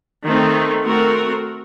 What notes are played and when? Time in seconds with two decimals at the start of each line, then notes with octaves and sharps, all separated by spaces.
0.24 D#3 A3 C4 D#4
0.82 A3 C4 F#4 A#4